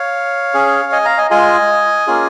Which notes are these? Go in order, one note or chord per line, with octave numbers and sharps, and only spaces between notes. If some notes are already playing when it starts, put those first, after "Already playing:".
Already playing: C#5 F5
C#4 G#4
D#5 G#5
F5 A#5
D#5 G#5
G#3 F4 G#4 D#5 G#5
A#3 C#4 F4 G#4